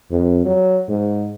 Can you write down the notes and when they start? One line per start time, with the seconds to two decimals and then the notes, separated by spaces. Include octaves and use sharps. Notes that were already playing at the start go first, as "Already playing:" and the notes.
0.11 F2
0.45 F#3
0.88 G#2